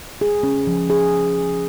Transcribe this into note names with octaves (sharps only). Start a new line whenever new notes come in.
G#4
C#4
F3
G#4